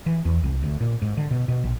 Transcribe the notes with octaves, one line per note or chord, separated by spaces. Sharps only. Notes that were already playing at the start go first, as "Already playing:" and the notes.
E3
E2
C2
D2
A#2
G#2
D3
B2
B2
A#1